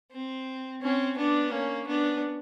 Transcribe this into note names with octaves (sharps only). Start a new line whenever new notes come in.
C4
C4 C#4
B3 D4
A#3 C#4
B3 D4